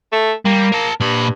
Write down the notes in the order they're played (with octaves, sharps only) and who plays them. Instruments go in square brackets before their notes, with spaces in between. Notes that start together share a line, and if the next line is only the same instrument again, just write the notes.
[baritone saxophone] A3
[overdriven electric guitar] G3 [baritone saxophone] A#3
[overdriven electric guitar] A#4 A5
[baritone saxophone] G2 [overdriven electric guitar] A#2 B5